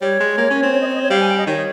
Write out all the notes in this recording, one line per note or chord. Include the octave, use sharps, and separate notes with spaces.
G3 C#5
G#3
A#3
C#4
C4
C#5
D#5
C#5
D#5
C#5
G3 F5
G#5
G5
D#5
D#3 C#5